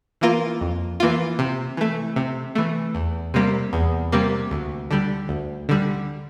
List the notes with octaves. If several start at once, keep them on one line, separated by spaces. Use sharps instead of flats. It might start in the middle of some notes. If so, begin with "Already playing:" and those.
E3 A#3 F4
F2
E3 A#3 F4
C3
E3 A3
C3
E3 A3
E2
C3 G3 A#3
E2
C3 G3 A#3
D2
D3 G3
D2
D3 G3